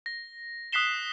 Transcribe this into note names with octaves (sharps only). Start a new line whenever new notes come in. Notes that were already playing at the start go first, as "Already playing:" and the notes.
A#6
D#6 F#6 B6 C7 E7 G7